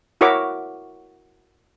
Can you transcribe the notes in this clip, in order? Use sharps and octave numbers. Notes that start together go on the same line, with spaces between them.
E4 F#4 A#4 C#5 E5 D6